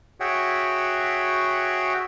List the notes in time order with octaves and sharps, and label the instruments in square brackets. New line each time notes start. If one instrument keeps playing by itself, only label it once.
[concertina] F#4 G#4 C#5 E5 F#5 G5